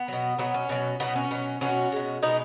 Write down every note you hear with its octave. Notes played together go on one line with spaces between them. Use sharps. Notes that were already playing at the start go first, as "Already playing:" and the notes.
Already playing: B3
B2 F#3
B2 F#3 B3
C#4
B2 F#3
B2 F#3 B3 D#4
C#4
B2 F#3
B2 F#3 C#4 F#4
B2 G#3
B2 G#3 B3 D#4